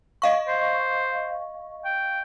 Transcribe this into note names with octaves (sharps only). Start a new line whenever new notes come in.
D#5 F5 C#6
C5
G5